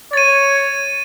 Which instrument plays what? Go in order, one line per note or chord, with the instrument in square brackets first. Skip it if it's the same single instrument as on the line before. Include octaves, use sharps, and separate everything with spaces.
[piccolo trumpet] C#5 [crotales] A6 D#7